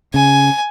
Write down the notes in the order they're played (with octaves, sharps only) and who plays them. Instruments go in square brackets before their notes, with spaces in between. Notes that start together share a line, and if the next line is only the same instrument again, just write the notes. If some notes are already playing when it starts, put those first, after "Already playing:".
[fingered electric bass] C#3 [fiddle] G#5